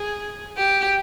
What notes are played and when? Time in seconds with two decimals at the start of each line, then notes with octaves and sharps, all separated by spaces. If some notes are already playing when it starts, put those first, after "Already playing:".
Already playing: G#4
0.57 G4